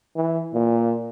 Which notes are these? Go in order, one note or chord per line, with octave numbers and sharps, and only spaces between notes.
E3
A#2